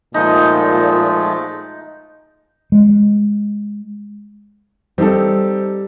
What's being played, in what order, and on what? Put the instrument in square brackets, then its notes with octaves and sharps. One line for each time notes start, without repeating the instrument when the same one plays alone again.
[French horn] A#2 [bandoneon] F3 G#3 A3 [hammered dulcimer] D#4
[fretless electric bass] G#3
[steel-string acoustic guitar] G3 [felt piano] C4 D#4 A4